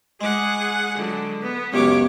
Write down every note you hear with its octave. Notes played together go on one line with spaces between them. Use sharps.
G#3 G#4 F#5 D6
D3 F#3
B3
C#2 F#2 B3 G4 C#5 D6